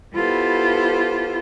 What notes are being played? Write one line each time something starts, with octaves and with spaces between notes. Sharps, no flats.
B3 E4 F4 G4 A4 C5